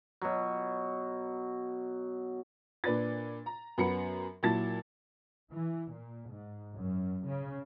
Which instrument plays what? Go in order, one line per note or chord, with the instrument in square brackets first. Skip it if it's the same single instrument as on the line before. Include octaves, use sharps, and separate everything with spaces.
[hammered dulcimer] B2 F#3
[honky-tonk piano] A#2 D4 B4 A6
A#5
F#2 F#3 B3 A#5 B5 C#7
A#2 F#3 E4 A5 A6
[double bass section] E3
A#2
G#2
F#2
C#3